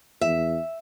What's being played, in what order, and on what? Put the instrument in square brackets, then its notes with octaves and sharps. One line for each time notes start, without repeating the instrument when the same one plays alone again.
[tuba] E2 [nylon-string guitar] E5